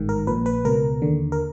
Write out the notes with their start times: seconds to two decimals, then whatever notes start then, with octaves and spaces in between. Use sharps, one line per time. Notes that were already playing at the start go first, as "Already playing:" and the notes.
Already playing: A1 G#2 D#3
0.09 A#4
0.27 A#1 A#2 B4
0.46 B4
0.65 C#2 B2 A#4
1.02 D#2 D3
1.32 A#4